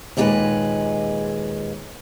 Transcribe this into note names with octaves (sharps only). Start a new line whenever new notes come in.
D#2 A#2 G#3 G4 G#4 B4